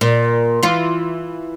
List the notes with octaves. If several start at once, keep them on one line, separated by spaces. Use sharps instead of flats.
A#2
E3 F4